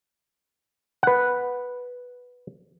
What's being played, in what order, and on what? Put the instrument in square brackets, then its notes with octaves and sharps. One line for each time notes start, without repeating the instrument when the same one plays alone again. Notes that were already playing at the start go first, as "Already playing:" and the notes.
[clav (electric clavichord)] B4 F#5